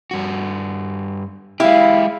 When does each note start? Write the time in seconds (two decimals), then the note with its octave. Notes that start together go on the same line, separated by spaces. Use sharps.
0.11 G2 F#4
1.60 G#3 E4 G4 F5